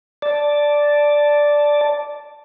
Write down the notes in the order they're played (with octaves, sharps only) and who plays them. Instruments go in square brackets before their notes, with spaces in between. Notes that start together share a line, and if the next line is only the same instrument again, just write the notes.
[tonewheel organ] D5 A5